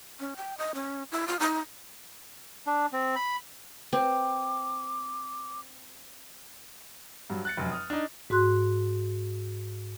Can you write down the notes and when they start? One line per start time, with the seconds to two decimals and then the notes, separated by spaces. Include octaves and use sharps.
0.20 C#4
0.36 G5
0.58 D#5
0.75 C#4
1.12 E4
1.27 F4
1.40 D#4
2.67 D4
2.93 C4
3.16 B5
3.93 C4 D6
7.30 G2 F#3
7.45 F#6 A6 C#7
7.57 F1 F#2
7.71 D#6 F6
7.90 D4 D#4
8.30 G#2 F#4 C6 F#6